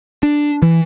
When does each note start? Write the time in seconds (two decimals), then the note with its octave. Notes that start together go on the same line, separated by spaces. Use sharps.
0.23 D4
0.62 E3